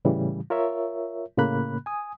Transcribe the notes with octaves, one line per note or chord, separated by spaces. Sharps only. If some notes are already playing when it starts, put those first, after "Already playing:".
A2 C#3 E3 G3
F4 A#4 C#5 E5
A2 C#3 A#3 B5 F#6
G#5 D#6